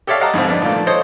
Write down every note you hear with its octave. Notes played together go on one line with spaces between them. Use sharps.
G4 A4 C#5 D5 E5 F5
D#5 F5 F#5 A5 A#5
F2 G#2 B2 C4
B3 D4 D#4
A#2 D#3 F3 A3
A4 C5 C#5 D#5